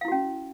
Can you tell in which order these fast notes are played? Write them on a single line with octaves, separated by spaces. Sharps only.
F5 E4 F#4 C#4